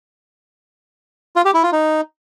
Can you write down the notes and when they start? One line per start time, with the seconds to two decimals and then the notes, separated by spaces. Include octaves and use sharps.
1.36 F4
1.45 G4
1.54 E4
1.63 F4
1.72 D#4